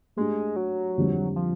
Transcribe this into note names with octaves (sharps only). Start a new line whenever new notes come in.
G#3 A3 D4 G4
F#3
F2 D3 G3 C4
F3